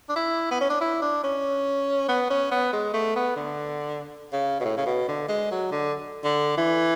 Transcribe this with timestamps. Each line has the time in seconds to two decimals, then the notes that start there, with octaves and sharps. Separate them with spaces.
0.09 D4
0.16 E4
0.51 B3
0.61 C#4
0.70 D4
0.81 E4
1.02 D4
1.24 C#4
2.09 B3
2.30 C#4
2.51 B3
2.73 G#3
2.94 A3
3.16 B3
3.36 D3
4.32 C#3
4.60 B2
4.65 A2
4.77 C#3
4.86 B2
5.08 D3
5.28 G#3
5.51 F#3
5.71 D3
6.24 D3
6.57 E3